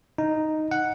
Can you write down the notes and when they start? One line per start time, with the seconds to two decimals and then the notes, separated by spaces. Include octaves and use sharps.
0.18 D#4
0.71 F#5